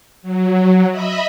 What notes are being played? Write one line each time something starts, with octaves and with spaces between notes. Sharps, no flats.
F#3
D#5 E5 B5